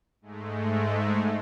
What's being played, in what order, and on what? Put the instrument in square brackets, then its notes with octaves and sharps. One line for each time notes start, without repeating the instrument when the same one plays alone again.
[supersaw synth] G#2 G#3 A3